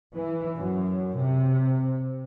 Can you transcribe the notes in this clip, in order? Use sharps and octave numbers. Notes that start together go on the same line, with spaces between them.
E3
F#2
C3